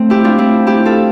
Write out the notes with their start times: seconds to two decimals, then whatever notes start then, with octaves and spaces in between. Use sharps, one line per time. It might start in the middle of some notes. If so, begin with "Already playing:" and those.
Already playing: A3 C4
0.10 E4 G4
0.24 D4 F4
0.38 C4 E4
0.67 E4 G4
0.85 F4 A4